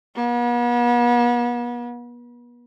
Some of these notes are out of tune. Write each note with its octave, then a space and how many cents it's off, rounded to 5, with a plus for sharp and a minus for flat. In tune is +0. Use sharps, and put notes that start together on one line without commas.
B3 -40